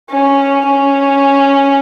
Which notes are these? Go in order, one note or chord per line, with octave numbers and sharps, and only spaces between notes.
C#4
C#4